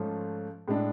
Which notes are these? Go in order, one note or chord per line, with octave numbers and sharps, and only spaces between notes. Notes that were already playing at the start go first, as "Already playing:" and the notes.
Already playing: G#2 F3 A3 C#4 F4
A2 G#3 D4